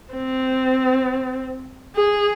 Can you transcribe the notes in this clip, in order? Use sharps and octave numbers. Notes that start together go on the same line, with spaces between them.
C4
G#4